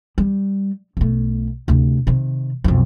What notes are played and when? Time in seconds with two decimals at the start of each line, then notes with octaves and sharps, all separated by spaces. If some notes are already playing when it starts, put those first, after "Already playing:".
0.18 G3
0.97 B1 A3
1.68 D2 C3
2.07 C3 D#3
2.64 B1 F2